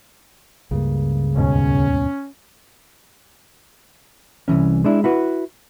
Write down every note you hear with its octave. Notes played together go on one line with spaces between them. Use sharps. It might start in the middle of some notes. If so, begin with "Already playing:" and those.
C#2 G2 C#3 A#3
D#2 G#2 B2 C#4
C2 G2 E3 C#4
G#3 D4 E4
E4 F#4 B4